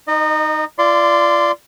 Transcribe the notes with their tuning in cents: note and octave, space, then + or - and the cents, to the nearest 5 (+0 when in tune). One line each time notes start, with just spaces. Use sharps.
D#4 +0 D#5 -30
F4 -35 D5 +0 C6 -15